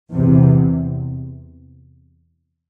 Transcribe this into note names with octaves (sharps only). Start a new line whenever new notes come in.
E2 C3